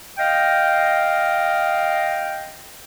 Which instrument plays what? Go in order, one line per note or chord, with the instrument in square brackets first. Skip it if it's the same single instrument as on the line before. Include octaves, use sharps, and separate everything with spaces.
[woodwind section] D#5 F5 G5